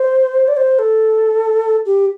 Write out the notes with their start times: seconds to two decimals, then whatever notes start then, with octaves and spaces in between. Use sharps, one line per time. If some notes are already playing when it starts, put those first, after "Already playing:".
Already playing: C5
0.47 D5
0.56 C5
0.78 A4
1.85 G4